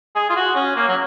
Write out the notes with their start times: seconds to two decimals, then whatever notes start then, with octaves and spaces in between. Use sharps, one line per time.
0.16 G#4
0.30 F4
0.36 F#4
0.55 C#4
0.76 A#3
0.88 F#3